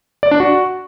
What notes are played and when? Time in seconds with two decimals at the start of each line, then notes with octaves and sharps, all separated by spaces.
0.23 D5
0.31 D4
0.40 F#4